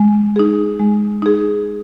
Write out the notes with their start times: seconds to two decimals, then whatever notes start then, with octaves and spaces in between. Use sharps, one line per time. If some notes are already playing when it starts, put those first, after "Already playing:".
Already playing: G#3
0.36 D#4 G#4
0.79 G#3
1.22 D#4 G#4